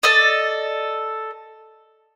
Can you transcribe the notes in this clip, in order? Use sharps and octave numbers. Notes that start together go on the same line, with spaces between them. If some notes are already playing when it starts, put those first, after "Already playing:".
A4 D5 D#5